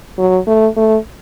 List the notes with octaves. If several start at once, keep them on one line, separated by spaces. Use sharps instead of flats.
F#3
A3
A3